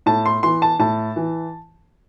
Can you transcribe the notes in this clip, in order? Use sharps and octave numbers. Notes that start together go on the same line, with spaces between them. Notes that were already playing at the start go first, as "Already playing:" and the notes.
A2 A5
C6
E3 C6
A5
A2 A5
E3